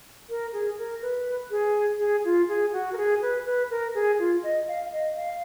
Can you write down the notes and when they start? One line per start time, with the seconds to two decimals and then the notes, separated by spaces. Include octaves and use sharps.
0.30 A#4
0.53 G#4
0.78 A#4
1.02 B4
1.51 G#4
1.99 G#4
2.25 F4
2.49 G#4
2.73 F#4
2.93 A#4
2.98 G#4
3.22 B4
3.46 B4
3.71 A#4
3.95 G#4
4.19 F4
4.43 D#5
4.68 F5
4.92 D#5
5.16 F5